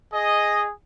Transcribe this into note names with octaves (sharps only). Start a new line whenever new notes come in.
G#4 D#5